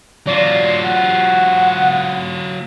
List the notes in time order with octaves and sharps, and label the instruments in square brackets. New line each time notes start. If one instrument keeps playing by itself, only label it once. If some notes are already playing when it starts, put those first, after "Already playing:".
[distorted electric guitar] F#3 F4 [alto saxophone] D5
[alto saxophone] F#5